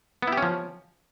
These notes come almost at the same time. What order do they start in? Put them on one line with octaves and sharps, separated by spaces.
B3 E4 G4 C#4 F3